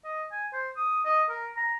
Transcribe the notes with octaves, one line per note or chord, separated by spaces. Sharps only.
D#5
G#5
C5
D#6
D#5
A#4
A#5